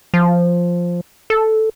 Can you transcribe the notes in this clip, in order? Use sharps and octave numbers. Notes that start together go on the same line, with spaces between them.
F3
A4